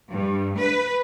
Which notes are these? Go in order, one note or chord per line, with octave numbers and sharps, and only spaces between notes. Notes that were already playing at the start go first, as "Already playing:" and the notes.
G2
B4